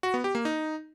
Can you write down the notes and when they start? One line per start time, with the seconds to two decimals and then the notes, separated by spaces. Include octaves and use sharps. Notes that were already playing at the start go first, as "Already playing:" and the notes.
0.03 F#4
0.14 B3
0.24 G4
0.35 A#3
0.45 D#4